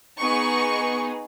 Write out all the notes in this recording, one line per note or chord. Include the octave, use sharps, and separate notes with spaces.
B3 D#4 G#4 C#6